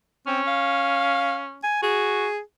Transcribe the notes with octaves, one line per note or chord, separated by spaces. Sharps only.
C4 C#4
F5
G#5
F#4 G#4